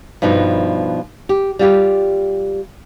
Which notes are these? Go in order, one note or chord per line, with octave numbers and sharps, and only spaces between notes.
G2 B2 F3 D#4
G4
G3 F4 G4